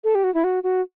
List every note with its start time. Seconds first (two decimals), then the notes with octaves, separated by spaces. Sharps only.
0.04 A4
0.15 G4
0.24 F#4
0.34 E4
0.44 F#4
0.63 F#4